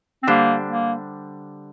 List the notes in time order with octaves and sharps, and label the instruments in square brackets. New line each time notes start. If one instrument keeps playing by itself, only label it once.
[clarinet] C4
[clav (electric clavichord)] D3 G3 D4 G4 C5 [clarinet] A#3
[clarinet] A#3